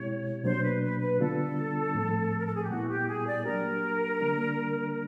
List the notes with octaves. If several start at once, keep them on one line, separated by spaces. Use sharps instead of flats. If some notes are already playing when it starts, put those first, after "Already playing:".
Already playing: B2 G#3 C4 E4 G4 C#5
B2 F#3 A#3 D4 C5
B4
B4
B4
D3 G3 B3 D4 F4 A4
A2 F3 A3 C4
A#4
A4
G#4
G4
A#2 G3 B3 E4 F#4
G4
G#4
D5
F#3 A#3 D4 G4 A#4
D3 G3 A#3 D4